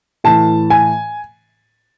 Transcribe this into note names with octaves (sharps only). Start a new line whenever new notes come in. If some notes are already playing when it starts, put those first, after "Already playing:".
A2 E3 A5
G#5